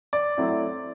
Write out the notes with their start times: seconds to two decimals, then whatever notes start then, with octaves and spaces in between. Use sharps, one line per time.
0.13 D5
0.37 F#3 A3 C4 E4